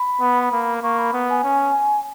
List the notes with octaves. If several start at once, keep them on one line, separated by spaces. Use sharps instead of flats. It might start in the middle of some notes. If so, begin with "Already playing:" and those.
Already playing: B5
B3
A#3
A#3 C#6
B5
B3
G#5
C#4